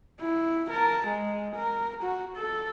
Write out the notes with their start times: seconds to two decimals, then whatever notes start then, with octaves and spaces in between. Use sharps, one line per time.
0.21 E4
0.70 A#4 A5
1.07 G#3
1.55 A#4
2.03 F#4
2.36 A4